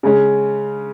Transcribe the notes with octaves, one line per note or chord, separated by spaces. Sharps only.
C#3 G#3 C#4